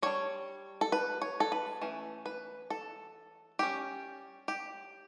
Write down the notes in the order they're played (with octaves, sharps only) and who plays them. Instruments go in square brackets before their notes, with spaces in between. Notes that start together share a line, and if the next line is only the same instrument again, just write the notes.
[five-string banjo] G3 D4 C#5
A4
B4
C#5
A4
B4
E3 A3 C#4
B4
A4
G3 C#4 G4
G4